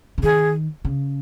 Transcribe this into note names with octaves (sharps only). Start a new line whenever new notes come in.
C#3
D#3 G#4
C#3